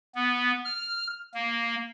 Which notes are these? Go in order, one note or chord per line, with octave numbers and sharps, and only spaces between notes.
B3
F6
A#3